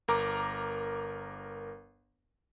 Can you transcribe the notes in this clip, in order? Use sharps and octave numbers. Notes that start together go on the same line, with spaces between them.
G1 A#4 A#5 D6